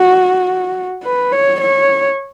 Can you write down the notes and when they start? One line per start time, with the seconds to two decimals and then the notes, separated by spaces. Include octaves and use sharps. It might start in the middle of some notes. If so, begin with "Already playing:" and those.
Already playing: F#4
1.04 B4
1.33 C#5
1.61 C#5